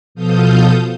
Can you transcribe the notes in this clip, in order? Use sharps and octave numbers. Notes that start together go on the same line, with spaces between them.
B2 F3 A4 F5 D#6 G6